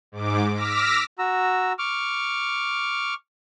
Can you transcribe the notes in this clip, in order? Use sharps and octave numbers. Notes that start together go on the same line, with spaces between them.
G#2 D6
D6 E6 F6 A#6 B6
F#4 A#5 E6
C#6 D6 F6